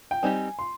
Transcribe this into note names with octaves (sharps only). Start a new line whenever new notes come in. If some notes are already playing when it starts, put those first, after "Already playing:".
G5
G3 C4 D#4 G4 G#5
C6